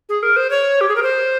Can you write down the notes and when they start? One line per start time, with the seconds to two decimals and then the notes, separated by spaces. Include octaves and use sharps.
0.09 G#4
0.23 A#4
0.36 C5
0.50 C#5
0.81 G4
0.88 G#4
0.96 A#4
1.03 C5